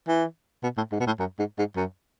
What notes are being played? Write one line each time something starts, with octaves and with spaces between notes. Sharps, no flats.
E3
B2
A2
G#2
B2
A2
F#2
G#2
G#2
F#2